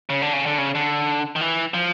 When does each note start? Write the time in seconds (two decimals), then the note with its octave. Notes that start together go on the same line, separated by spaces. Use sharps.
0.10 C#3
0.22 D3
0.33 C#3
0.46 D3
0.58 C#3
0.75 D3
1.36 D#3
1.41 E3
1.74 F3